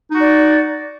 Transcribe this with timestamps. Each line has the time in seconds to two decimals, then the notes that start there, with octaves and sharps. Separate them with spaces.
0.11 D#4
0.15 F#4
0.19 D5